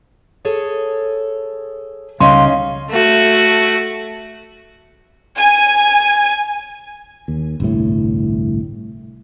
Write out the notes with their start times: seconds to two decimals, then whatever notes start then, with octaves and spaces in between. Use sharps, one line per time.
0.45 G#4 A4 C#5
2.20 C#2 G3 C#4 D#4 D#5 F5 C6
2.90 A3 F#4
5.37 G#5
7.28 D#2
7.60 G1 C2 A2